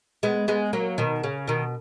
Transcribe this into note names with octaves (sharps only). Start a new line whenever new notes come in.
G#3 B3
G#3 B3
F#3 A#3
B2 D#3
C#3
B2 D#3